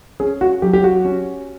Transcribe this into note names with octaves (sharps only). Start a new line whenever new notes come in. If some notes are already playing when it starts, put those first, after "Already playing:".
C#4 G#4
F#4
F#3 G4
G4
F#4
C#4